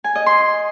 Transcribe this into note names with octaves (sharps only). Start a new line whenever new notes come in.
G#5
D#5
C6